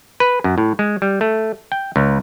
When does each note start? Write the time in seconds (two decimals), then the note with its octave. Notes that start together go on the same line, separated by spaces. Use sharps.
0.20 B4
0.44 F#2
0.58 A2
0.79 G#3
1.02 G3
1.21 A3
1.72 G5
1.96 C#2